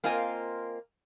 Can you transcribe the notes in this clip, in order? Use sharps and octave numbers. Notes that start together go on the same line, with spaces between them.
A#3 C4 F4 A#4 D#5 G#5